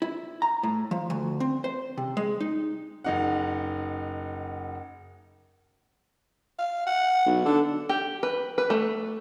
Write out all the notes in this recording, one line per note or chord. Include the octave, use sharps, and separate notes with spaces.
E4
A#5
A2
F3
D2
C4
C5
C3
G#3
D#4
F#1 D#4 F#5
F5
F#5
B1
D3 A4
G4
B4
B4
A3